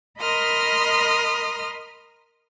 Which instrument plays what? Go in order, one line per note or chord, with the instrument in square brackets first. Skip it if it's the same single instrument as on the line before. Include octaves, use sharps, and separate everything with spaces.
[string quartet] A#4 D#5 B5 C6 D#6 F6